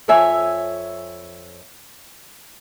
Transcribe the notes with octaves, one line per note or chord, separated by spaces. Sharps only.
F2 C#5 E5 G#5